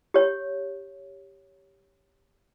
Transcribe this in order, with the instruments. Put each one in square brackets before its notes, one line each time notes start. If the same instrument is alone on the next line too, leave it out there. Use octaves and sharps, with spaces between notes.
[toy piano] G4 C#5